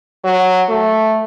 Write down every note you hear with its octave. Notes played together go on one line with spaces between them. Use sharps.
F#3
A3